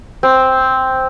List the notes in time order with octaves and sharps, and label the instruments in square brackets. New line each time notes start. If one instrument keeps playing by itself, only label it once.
[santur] C4